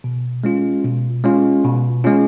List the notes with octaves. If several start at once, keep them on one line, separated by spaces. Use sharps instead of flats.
B2
G#3 C#4 F4
B2
G#3 C#4 F4
B2
G#3 C#4 F4